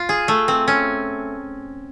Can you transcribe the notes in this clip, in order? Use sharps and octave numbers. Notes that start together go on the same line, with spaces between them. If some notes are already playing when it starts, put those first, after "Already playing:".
Already playing: F4
G#4
A3
C4
C#4